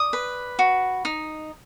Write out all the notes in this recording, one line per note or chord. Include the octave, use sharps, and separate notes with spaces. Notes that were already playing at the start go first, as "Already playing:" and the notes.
Already playing: D5 D#6
B4
F#4
D#4